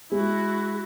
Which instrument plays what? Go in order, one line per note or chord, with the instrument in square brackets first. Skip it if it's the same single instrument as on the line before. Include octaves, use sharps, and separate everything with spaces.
[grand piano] G#3 [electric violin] E4 F#4